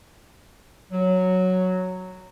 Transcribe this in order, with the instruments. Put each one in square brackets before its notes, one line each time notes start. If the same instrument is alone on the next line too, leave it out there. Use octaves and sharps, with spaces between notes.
[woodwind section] F#3